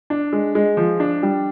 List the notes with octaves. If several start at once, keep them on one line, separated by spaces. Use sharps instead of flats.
D4
G#3
G#3
F3
D4
G3